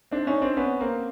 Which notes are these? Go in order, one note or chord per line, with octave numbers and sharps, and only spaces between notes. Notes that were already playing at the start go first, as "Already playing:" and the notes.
C4 D4
C#4 D#4
C4 D4
B3 C#4
A#3 C4